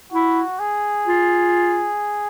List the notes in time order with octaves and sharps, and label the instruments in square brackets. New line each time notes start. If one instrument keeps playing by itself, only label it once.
[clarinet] E4 [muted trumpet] F#4
[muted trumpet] G#4
[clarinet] F4